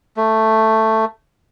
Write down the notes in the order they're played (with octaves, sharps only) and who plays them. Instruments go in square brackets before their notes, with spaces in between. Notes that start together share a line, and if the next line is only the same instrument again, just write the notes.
[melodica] A3